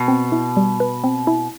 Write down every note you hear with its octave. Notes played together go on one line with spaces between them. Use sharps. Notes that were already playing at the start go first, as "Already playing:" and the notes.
Already playing: B2
C4
E4
G3
B4
C4
E4